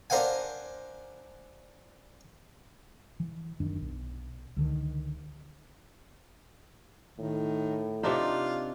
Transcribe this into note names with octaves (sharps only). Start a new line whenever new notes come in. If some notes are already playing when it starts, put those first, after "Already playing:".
D4 A#4 C5 F5 F#5 G#5
E3
F1 F#2 D#3 D4
B1
C#2 D3 D#3
A2 D#3
C3 D4 D#4 F4